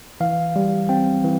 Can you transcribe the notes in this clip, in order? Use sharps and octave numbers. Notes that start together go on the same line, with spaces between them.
E3 F5
G3
C4 G5
E3